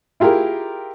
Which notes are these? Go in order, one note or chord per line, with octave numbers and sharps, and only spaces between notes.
E4 F4 G4 G#4 A#4